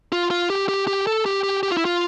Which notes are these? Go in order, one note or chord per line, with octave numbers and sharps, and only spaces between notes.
F4
F4
G4
G4
G4
A4
G4
G4
G4
F4
E4
F4